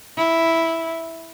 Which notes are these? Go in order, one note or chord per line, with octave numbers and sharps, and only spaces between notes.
E4